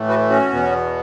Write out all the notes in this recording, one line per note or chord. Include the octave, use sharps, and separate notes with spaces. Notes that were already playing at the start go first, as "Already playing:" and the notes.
Already playing: A2 E3 A3
F#4 B4
C#4 F#4
E2 B2 B3